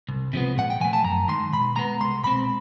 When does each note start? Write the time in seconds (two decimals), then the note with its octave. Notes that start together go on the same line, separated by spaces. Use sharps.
0.09 C2
0.33 C3 F3 G#3 B3
0.57 A#2 F#5
0.70 G5
0.80 F3 A3 G#5
0.93 A5
1.04 F#2 A#5
1.28 D#3 G#3 C6
1.52 B2 B5
1.76 G#3 B3 A#5
2.01 C2 C6
2.24 B2 G#3 C4 B5